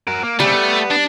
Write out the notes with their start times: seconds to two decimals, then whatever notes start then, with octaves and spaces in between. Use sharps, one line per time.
0.07 F#4 A#4
0.23 A#3
0.40 C#3 G3 A3 C4
0.53 B3
0.91 D4